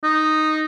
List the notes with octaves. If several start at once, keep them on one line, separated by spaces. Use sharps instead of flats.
D#4